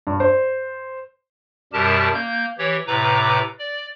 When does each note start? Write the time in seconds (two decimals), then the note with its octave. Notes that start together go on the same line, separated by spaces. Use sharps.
0.07 G2
0.20 C5
1.73 F#2 B2 G3 G4 A#4 A5
2.14 A#3 G6
2.58 E3 G4 C#5
2.87 A2 C3 B4 A#5 D6
3.59 D5